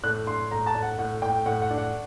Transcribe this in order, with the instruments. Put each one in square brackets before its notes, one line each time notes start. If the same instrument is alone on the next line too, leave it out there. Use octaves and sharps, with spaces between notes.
[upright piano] A2 F#6
D4 C6
A2 A#5
A5
A2
F#5
A2 F#5
A2 G5
A2 F#5
F#5
D4
F#5